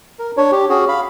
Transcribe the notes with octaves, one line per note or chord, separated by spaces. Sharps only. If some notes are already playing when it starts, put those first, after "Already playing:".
A#4
D4 C#5
G4
C#4 F#4 G#4
F5 B5